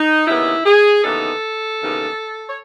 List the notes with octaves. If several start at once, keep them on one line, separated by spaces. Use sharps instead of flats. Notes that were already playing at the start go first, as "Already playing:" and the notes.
Already playing: D#4
D#2 C#3 E3 B3 D#4 E4
G#4
D#2 C#3 E3 B3 D#4 A4
D#2 C#3 E3 B3 D#4
C#5